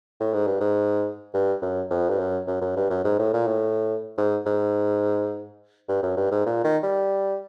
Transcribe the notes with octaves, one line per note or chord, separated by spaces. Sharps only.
A2
G#2
G2
G#2
G2
F#2
F2
G2
F#2
F#2
F#2
G2
F#2
G#2
A2
A#2
A2
G#2
G#2
G2
F#2
G2
G#2
A#2
D#3
G3